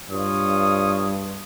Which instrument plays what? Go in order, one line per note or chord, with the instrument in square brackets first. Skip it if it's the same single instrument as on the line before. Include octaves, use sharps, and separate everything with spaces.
[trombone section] G2 [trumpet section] F4 C#5 D#6